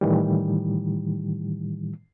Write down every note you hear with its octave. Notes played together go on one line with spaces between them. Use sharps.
A2 D#3 E3 G3